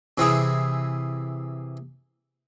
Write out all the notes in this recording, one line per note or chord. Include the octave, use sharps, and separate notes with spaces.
C3 E3 C4 E4 G#4